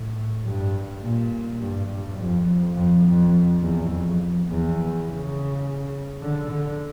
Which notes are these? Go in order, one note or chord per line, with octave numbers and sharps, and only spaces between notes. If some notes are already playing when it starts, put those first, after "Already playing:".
Already playing: A2
G2
A#2
G2
G2
F2
F2
F2
E2
F2
E2
C#3
D3
D3